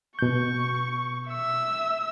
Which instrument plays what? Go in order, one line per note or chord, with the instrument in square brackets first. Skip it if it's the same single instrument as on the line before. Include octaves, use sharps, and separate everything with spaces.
[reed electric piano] B2 G6 [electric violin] C#6
[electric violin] E5 E6